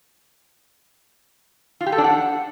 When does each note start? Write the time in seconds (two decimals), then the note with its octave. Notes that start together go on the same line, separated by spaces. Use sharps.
1.81 F4
1.86 G4
1.92 A4
1.98 D4
2.04 F#5